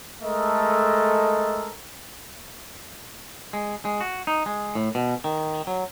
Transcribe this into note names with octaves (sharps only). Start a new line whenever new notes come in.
G#3 A3 A4 A#4 D#5
G#3
G#3
F#4
D#4
G#3
A2
B2
D#3
F#3